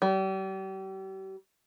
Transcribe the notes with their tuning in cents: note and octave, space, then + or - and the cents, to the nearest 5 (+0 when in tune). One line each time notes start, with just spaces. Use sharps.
G3 -40